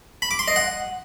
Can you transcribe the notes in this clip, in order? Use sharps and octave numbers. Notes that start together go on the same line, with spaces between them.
B5
D6
C6
D#5
F#5